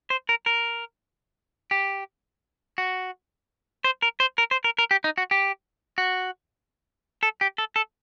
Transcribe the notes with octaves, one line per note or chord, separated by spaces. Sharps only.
C5
A#4
A#4
G4
F#4
C5
A#4
C5
A#4
C5
A#4
A#4
G4
D#4
F#4
G4
F#4
A4
G4
A4
A4